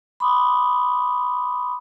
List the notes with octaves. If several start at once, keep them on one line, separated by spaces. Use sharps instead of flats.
B5 C6 D6 D#6